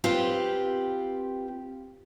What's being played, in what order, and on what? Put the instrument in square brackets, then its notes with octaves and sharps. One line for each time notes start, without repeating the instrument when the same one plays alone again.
[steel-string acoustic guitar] C4 F4 G4 B4